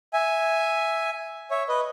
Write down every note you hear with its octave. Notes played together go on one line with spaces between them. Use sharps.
E5 G#5
C#5 E5
B4 D#5